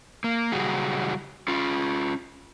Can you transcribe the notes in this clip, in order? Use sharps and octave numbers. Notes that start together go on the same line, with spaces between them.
A#3
C#3 F#3 G3 F#4 G#4
C#4 F4